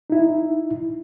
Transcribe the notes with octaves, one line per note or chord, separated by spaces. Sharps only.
D#4 E4